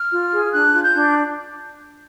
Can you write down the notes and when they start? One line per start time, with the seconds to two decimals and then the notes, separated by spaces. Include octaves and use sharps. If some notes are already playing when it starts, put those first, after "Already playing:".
Already playing: F6
0.11 F4
0.32 G#4
0.53 D4 F#6
0.72 F4
0.83 G6
0.93 D4